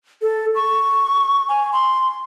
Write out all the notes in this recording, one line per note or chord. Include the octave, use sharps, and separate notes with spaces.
A4
C#6
G#5
C6